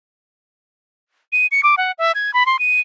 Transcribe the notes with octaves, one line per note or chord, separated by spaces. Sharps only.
D#7
C#7
D6
F#5
E5
G#6
B5
C6
D#7